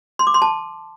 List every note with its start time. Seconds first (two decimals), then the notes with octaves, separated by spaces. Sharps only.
0.19 C6
0.27 D6
0.34 C6
0.42 A5